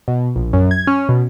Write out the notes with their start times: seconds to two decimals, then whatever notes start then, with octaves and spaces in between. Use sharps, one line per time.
0.08 B2
0.36 A#1
0.53 F#2
0.71 G#6
0.87 C#4
1.09 B2